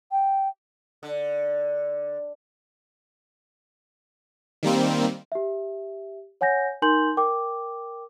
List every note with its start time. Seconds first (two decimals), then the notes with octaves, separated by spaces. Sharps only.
0.12 G5
1.03 D3
4.63 D#3 G3 A#3 C4
5.32 G4 E5
6.41 C#5 F#5 G#5 G6 A#6
6.82 D#4 A#4 G#5 C6 G6 F#7
7.17 A#4 G5 D6